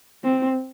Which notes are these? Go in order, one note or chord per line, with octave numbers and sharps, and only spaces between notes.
C4